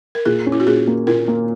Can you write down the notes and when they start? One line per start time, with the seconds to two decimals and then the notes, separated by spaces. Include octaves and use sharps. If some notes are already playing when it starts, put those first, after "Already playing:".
0.15 A#4
0.25 A#2 G#4
0.46 C#4
0.52 E4
0.60 F#4
0.67 A#2 G#4
0.87 A#3
1.07 A#2 A#4
1.28 A#3